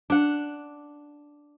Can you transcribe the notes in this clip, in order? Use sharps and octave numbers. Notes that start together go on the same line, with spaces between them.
D4 F#5